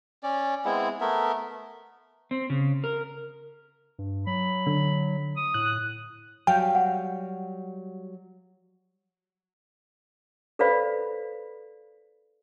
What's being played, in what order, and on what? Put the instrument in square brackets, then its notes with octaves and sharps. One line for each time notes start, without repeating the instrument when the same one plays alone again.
[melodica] C#4 D5
G#3 B3 C4 E4
A3 B3 A#4 E5
[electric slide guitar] C4
C#3
A#4
[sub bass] G2
[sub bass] F#3 [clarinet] B5
[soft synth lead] D3
[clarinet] D#6
[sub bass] A2 [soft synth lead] F#6
[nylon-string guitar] F#3 G3 F5 [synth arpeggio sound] G5
[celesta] F#5
[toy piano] A4 B4 C5 D5 F5 B5